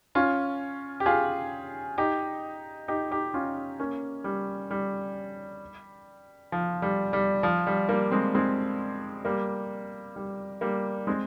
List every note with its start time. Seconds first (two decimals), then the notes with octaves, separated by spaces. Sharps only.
0.15 C#4 F4
1.00 G4
1.06 F4 G#4
1.98 D#4 G4
2.88 D#4 G4
3.11 D#4 G4
3.34 C#4 F4
3.79 A#3 C#4
4.24 G3
4.71 G3
6.52 F3
6.82 G3
7.13 G3
7.43 F3
7.67 G3
7.89 G3 A#3
8.11 G#3 C4
8.35 G#3 C4
9.25 G3 A#3
10.16 G3
10.61 G3 A#3
11.07 G#3 C4